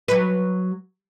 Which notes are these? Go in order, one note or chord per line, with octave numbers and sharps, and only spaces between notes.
F#3 B4